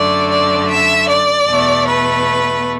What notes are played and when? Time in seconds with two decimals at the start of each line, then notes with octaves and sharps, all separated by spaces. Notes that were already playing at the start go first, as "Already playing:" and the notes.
Already playing: F#2 D3 A3 D5
0.31 D5
0.69 E5
1.08 D5
1.48 E2 B2 A3
1.87 B4